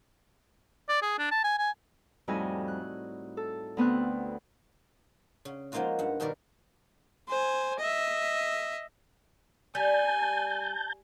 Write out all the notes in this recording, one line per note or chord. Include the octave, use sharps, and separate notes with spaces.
D5
G#4
D4
A5
G#5
G#5
F2 A2 G3 D#4 F#4 G#5
F#6
A4
D2 B3 C4 F#6
C#3
F3 G#3 A#3 D#4 F4 F#4
G2 F#5
G2 B2 D#3 A#4 D5
C5 G#5
D#5 E5
G3 G#5 A5 G6